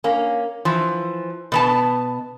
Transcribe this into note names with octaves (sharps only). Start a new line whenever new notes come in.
A#3 C#4
E3 F3
B2 B3 A5